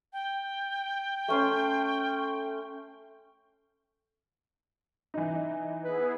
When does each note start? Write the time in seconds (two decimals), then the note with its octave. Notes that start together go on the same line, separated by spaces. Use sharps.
0.13 G5
1.28 A3 C#4 C6
5.14 E3 D#4
5.84 B3 E4 G#4 B4